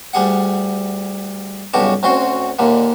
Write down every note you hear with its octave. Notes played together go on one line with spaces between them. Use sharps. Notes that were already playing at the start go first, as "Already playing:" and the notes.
D2 G3 G#4 F#5
B1 G2 C#3 F#4 G4 A5
D2 C4 C#4 F#4 C6
D#2 A#2 D3